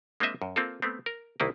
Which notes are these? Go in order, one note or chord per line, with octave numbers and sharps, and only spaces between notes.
G#3 A#3 C4 D4 D#5 E5
F#2
A#3 C4 F4 A4
A3 B3 C4
A#4
C2 D#3 A#3 E4 B4